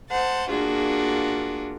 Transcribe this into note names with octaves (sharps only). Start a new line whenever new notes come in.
C5 F#5 A5
A#3 D4 F4 F#4 G#4